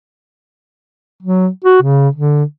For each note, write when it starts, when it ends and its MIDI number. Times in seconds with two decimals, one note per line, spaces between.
1.23 1.48 54
1.65 1.77 66
1.82 2.09 49
2.16 2.43 50